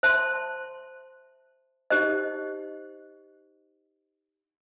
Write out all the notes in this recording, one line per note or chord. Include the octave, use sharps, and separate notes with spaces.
C5 E5 A5 C6
D#4 G4 C5 D#5